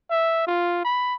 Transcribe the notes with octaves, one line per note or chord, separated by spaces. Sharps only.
E5
F4
B5